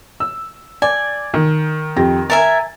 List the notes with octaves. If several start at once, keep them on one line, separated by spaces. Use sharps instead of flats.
E6
D5 G#5
D#3
F2 G4 A#6
A#4 E5 G#5 A6